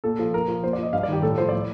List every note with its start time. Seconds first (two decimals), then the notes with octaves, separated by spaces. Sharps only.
0.04 A#2 A4
0.18 F3 A4
0.33 A#2 A#4
0.48 F3
0.64 A#2 C5
0.73 D5
0.78 F3 D#5
0.93 G2 F5
1.03 D5
1.08 D#3 G4
1.22 A2 A4
1.38 F3 C5
1.49 A2 D5